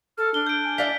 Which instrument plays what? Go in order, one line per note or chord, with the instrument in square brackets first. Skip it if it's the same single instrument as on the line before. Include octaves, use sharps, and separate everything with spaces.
[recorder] A4 [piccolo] F6
[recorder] D4 [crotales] G7
[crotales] G6 D7
[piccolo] G#5
[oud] E4 D5 F5 [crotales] B6 G7